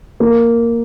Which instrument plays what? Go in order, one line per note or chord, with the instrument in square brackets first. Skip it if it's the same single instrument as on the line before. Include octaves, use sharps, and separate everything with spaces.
[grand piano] A#3